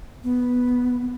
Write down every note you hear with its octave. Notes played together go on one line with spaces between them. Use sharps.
B3